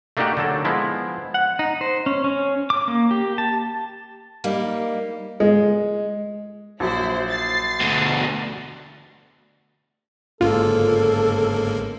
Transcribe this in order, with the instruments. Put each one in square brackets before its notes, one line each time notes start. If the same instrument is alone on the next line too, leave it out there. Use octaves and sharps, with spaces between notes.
[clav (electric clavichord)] A3 A#3 D4 D#4 F#4 G4
D3 F#3 A4
F3 G#3 B3 E4
[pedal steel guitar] F#5
D#4
C5
C#4
C#4
D6
A#3
G4
A5
[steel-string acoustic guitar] G3 A#3 D#4
[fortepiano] G#3
[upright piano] A#1 F#3 [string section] E4 C5
[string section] A6 C7
[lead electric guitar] D2 B2
[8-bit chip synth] G1 G#2 A#3 [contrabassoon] C#3 [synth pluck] F4 [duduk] A4